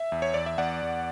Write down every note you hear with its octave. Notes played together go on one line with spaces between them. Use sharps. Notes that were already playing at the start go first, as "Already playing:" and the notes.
Already playing: E5
E2
C#5
E2 D5
E5
E2 D5 F#5
E2